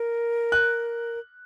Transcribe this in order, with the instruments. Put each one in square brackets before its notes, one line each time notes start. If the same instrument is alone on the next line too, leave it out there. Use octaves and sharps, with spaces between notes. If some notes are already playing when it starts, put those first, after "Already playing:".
Already playing: [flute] A#4
[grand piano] F#6